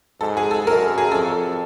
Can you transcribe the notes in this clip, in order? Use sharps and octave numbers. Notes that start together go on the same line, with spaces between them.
G#2 A4
G#4
A4
F#2 A#4
G#4
F2 A4